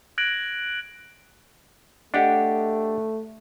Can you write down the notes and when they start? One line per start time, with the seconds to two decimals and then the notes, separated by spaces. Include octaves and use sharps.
0.18 F#6 G#6 A#6 D7 F#7
2.14 A3 D4 G4 D#5 F#5